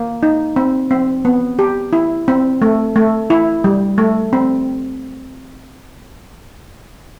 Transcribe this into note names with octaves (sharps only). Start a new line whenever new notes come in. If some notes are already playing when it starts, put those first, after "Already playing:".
Already playing: A#3
D#4
C4
C4
B3
G4
E4
C4
A3
A3
E4
G3
A3
C4